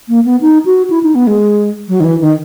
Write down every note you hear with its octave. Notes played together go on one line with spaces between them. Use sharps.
A#3
B3
D#4
F#4
E4
D#4
B3
G#3
F#3
D#3
E3
D#3